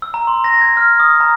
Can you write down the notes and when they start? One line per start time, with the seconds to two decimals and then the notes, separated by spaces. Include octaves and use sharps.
0.02 E6
0.14 A#5
0.27 C6
0.44 A#6
0.61 G#6
0.77 F6
1.00 D#6
1.20 A#5